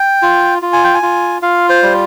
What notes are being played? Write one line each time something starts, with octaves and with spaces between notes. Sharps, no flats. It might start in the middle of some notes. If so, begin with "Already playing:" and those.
Already playing: G5
F4
F4
G#5
G5
G#5
F4
F4 F5
C5
G3